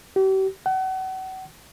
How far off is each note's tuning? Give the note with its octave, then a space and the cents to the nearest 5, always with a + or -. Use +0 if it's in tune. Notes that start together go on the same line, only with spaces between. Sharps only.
G4 -40
F#5 +35